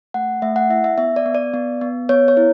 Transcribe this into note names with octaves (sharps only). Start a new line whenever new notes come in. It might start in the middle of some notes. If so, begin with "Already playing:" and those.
A3 F#5
A3 E5
F#5
E4 E5
E5
B3 E5
D5
B3
D5
B3
B3
B3 C#5
C#5
E4